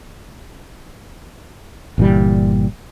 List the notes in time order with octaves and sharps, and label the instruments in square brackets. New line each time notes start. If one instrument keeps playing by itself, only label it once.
[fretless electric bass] G1 A#2 E3 G3